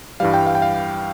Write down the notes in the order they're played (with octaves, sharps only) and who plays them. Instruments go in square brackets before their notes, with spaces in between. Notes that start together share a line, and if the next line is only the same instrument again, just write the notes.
[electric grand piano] G2 E3 G3 F5
G5
F5
G5
F5